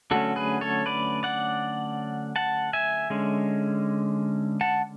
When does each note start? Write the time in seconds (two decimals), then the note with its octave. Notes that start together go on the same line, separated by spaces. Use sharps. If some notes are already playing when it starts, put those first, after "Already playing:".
0.11 D3 F#3 A3 C#4 F#4 A4
0.36 G#4 B4
0.61 A4 C#5
0.86 B4 D5
1.23 D5 F#5
2.36 F#5 A5
2.73 E5 G#5
3.10 D3 G#3 C#4
4.61 F#5 A5